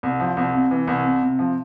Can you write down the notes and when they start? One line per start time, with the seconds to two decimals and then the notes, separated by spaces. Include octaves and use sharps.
0.03 C2
0.20 F3
0.37 C2
0.54 C3
0.71 E3
0.87 C2
1.04 C3
1.22 C3
1.39 F3